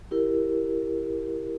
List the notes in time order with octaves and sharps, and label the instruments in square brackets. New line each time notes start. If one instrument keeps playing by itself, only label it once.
[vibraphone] E4 G4 A#4